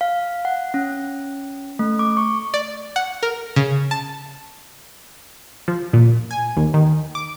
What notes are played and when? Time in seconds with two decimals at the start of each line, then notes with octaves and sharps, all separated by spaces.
0.01 F5
0.45 F#5
0.74 C#4
1.79 A3
1.99 D6
2.17 C#6
2.54 D5
2.96 F#5
3.23 A#4
3.56 C#3
3.91 A5
5.68 F3
5.93 A#2
6.31 G#5
6.56 D#2
6.74 D#3
7.15 D6